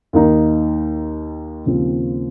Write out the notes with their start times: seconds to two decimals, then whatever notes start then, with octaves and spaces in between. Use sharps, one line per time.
0.13 D#2 D#3 A#3 D#4
1.66 D#2 C#3 F3 C4 F4